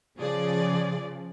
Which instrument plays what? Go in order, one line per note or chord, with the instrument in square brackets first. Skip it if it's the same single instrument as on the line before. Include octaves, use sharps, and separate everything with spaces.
[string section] C#3 F3 [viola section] G#4 D5